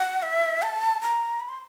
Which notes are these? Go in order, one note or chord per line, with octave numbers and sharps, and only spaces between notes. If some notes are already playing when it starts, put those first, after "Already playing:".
Already playing: F#5
E5
A5
A#5
B5
C6